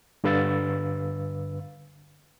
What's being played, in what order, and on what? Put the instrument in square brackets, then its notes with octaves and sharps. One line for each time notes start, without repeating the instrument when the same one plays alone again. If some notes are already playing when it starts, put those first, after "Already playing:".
[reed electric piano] G2 D3 B4 F5 E6 A6